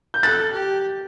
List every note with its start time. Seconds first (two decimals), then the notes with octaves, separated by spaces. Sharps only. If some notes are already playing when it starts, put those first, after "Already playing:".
0.14 G6
0.23 A4 F#6 A6
0.52 G4